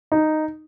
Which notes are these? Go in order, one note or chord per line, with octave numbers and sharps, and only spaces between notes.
D#4